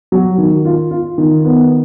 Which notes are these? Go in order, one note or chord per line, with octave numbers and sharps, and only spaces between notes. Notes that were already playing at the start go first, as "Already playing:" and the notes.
F#3
D#3
F4
F4
D#3
B3